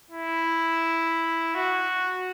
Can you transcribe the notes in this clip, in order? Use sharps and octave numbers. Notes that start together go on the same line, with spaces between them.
E4
F#4